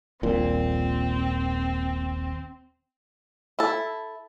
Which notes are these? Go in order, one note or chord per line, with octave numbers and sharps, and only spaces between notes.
D#1 A#1 A#2 C4
E4 A4